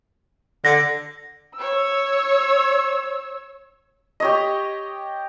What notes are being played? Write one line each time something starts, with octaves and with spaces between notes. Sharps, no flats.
D3 A#6
C#5 E6
G4 C#5 D#5